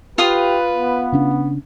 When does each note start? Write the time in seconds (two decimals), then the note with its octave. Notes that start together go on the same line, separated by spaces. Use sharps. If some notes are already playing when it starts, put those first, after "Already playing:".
0.18 F4 G4 B4 F5 D#6
0.72 B3
1.12 C#3 C#4 D4